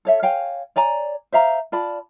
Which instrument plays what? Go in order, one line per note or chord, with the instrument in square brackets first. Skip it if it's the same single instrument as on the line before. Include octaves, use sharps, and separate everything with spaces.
[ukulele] A4 C#5 E5
C#5 F5 G5 G#5
C#5 D5 G#5 A#5
C5 E5 F5 A#5
F4 D5 A5 B5